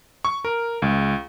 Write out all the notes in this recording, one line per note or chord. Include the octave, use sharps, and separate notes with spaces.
C#6
A#4
C#2